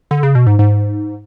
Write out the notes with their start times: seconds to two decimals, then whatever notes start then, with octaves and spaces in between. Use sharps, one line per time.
0.11 D3
0.23 C#3
0.35 B2
0.47 G#2
0.59 G#2